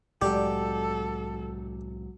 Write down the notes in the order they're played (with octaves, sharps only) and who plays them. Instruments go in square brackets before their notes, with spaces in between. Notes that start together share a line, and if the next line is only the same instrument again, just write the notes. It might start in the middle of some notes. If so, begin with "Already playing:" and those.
[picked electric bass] C2 A2 G#3 [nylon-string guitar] F#3 D5 [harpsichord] G4 [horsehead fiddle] A4